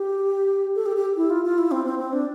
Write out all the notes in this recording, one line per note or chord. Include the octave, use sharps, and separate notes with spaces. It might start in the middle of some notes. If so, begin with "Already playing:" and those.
Already playing: G4
A4
G4
G4
E4
F4
F4
E4
C4
C4
C4
D4